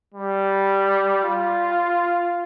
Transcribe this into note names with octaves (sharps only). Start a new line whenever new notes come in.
G3
F4